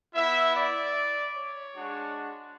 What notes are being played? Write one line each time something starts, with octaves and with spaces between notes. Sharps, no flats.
B3 E4 E5
D5
C#5
G#3 D4 F#4